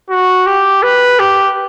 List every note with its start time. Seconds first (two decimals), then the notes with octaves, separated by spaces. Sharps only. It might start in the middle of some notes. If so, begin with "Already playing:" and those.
0.10 F#4
0.46 G4
0.83 B4
1.19 G4